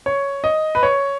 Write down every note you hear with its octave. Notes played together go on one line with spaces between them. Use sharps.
C#5
D#5
B4
C#5